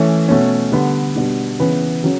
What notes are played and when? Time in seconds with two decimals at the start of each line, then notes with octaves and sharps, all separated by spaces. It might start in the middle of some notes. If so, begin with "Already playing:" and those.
Already playing: E3 A3 C#4
0.28 B2 A3 C#4
0.72 D3 G3 B3
1.16 B2 G3 D4
1.59 C#3 E3 B3 B4
2.03 C#3 F#3